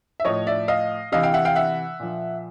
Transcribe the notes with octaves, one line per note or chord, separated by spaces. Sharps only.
E5
A2 F3 C#5 D#5
D5 E5
D#5 F5
C3 E3 D#5 F5
F5 G5
E5 F#5
F5 G5
E5 F#5
A#2 F3